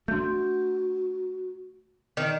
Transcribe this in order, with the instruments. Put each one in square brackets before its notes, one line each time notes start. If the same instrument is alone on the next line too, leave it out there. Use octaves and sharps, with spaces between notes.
[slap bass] A3 D4 [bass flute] F#4 [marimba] C6 G6
[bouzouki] D#3